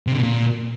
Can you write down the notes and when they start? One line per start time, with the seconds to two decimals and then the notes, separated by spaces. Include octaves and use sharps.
0.07 C3
0.12 D3
0.18 B2
0.23 A#2